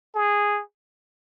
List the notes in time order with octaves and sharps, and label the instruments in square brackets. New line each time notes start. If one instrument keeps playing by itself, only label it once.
[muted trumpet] G#4